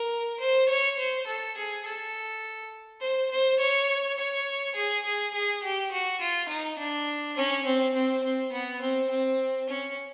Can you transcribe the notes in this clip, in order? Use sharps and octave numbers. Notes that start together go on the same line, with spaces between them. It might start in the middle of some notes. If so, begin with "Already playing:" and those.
Already playing: A#4
C5
C#5
C5
A4
G#4
A4
C5
C5
C#5
C#5
G#4
G#4
G#4
G4
F#4
F4
D#4
D4
C#4
C4
C4
C4
B3
C4
C4
C#4